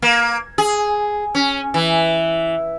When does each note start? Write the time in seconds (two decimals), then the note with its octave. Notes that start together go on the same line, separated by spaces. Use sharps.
0.02 A#3
0.58 G#4
1.35 C#4
1.74 E3